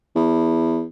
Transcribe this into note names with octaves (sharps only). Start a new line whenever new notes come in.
E2